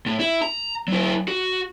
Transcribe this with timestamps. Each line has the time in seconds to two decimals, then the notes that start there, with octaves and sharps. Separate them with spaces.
0.06 A2
0.20 E4
0.42 A#5
0.88 F#3 E4
1.28 F#4